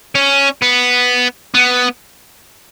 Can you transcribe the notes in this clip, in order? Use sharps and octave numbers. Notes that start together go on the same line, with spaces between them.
C#4
B3
B3